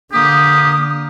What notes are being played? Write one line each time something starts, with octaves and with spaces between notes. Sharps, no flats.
D3 A#3 G4 D#6